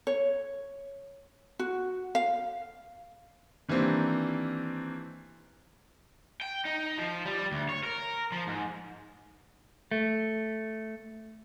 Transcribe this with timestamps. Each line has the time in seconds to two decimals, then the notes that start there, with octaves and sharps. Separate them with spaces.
0.07 C#5
1.59 F#4
2.15 F5
3.69 D#3 E3 G3 A#3 C4 D4
6.41 G5
6.66 D#4
6.98 F3
7.25 G3
7.51 D2
7.69 C#5
7.83 A#4
8.32 F3
8.47 G#2
9.91 A3